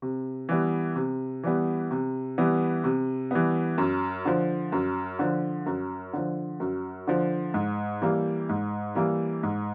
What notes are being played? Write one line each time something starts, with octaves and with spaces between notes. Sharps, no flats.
C3
E3 G3 B3
C3
E3 G3 B3
C3
E3 G3 B3
C3
E3 G3 B3
F#2
D3 F3
F#2
D3 F3
F#2
D3 F3
F#2
D3 F3
G#2
E3 G3 A#3
G#2
E3 G3 A#3
G#2